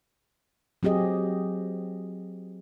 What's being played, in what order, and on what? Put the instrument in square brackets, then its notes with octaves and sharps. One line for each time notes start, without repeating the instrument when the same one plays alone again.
[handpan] F#3 C4 G4 G#4 D#5